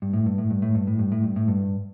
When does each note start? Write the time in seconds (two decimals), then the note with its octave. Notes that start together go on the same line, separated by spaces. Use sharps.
0.02 G2
0.13 A2
0.26 G2
0.38 A2
0.50 G2
0.62 A2
0.75 G2
0.87 A2
0.99 G2
1.12 A2
1.24 G2
1.36 A2
1.48 G2